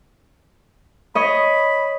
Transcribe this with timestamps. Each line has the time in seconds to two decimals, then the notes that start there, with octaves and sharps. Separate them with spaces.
1.15 C#5 D#5 B5